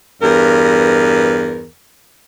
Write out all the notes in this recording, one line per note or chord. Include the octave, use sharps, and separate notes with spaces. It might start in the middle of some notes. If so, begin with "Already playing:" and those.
E2 G2 A#4